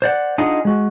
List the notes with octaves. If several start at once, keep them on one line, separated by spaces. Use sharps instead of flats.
C5 D5 F#5
D4 D#4 F4 G#4 D#5 F#5
G#3 F#4